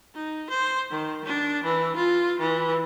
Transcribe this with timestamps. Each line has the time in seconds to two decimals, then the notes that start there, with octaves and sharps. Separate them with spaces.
0.14 D#4
0.50 C5
0.90 D#3
1.25 D4
1.64 E3
1.96 F4
2.39 E3